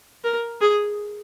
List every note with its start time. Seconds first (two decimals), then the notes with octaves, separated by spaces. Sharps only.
0.24 A#4
0.61 G#4